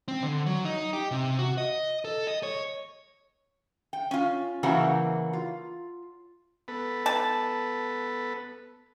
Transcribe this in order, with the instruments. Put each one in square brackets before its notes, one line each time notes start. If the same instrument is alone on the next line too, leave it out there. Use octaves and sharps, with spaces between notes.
[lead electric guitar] C4
D3
F#3
D#4
G4
C3
F#4
D#5
A4
D#5
C#5
[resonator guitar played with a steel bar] G5
C#4 F4
C#3 E3 F#3 A#3 F#4 A#5
F4
[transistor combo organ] B3 A4 B4
[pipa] A5